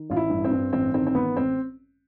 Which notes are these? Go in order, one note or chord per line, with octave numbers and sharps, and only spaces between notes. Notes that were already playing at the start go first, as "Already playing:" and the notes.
Already playing: D#3
A1 F4
E4
G2
C4
G2
A1 C4
D#3 C4
C4
A1 B3
A1 C4